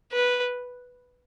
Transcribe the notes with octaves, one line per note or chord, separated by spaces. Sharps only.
B4